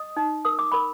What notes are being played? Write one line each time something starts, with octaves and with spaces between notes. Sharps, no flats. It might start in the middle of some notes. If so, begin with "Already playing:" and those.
Already playing: D#5 D#6
D#4
A#4 D#6
D6
A#4 B5